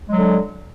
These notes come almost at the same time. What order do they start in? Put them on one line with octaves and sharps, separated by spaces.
G#3 F#3 D3